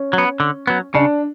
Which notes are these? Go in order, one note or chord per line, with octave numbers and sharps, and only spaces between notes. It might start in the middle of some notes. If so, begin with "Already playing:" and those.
Already playing: C#4
F#3 B3
D3
F#3 B3
C#3 D4